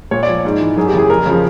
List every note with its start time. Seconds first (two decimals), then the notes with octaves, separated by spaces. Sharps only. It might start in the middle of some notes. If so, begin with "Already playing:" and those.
0.11 A#2 C#5
0.23 D5
0.28 F3
0.45 G#2
0.61 E3
0.77 F#2 G#4
0.87 G4
0.93 C#3 E3 G#4
1.10 F2 A#4
1.26 C#3 F3